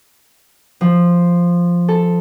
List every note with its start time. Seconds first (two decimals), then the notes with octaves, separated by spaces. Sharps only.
0.81 F3
1.88 A4